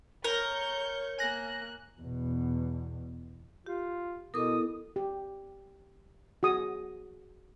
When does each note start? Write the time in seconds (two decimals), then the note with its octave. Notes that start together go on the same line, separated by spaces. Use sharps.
0.24 A#4 C#5 C#6 G6
1.19 A#3 G#5 F#6 A#6
2.01 E2 B2
3.66 F4 G4
4.34 B2 B3 E4 A4 A#4 D6 D#6
4.96 G4
6.43 F#4 G#4 D#6